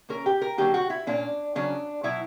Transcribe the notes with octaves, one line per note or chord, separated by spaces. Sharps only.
E3 A#3 C#4 A#4
G4
A#4
D3 F#3 A#3 G4
F#4
E4
A#2 A#3 C#4 D4
C#3 F#3 C#4 D4
B2 F#3 B3 E4